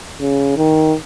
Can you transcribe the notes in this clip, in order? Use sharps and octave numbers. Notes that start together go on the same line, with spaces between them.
C#3
D#3